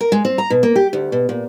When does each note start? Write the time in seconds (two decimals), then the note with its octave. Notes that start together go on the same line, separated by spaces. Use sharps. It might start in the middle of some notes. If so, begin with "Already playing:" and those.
0.01 A#4
0.12 G#3
0.25 C4
0.38 A#5
0.50 B2
0.63 A#3
0.76 G4
0.93 D2
1.12 B2
1.29 A#2